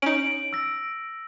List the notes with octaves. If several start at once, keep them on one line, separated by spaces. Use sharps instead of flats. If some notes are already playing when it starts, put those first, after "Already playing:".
C#4 D#4 D7 F#7
E6 A#6